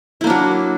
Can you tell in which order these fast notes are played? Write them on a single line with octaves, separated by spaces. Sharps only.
E4 A#3 D4 F#3